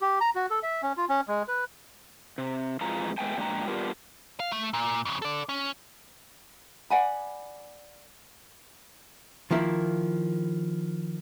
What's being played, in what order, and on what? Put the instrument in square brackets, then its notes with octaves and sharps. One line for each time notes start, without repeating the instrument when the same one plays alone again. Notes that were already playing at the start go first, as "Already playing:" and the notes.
[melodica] G4
A#5
F#4
A4
E5
C#4
F4
C#4
G#3
B4
[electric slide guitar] C3
F2 E3 G#3 F4 A#5
G#3 A3 B3 G5 G#5
A#2 F3 G#3 D4 G5 A#5
G3 B3 D4 F4 G4 A#4
[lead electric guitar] F5
A3
A#2
F2 C#3
A4 D5
C#4
[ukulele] D5 F#5 G#5 B5
[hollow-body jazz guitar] D#3 F3 A#3 E4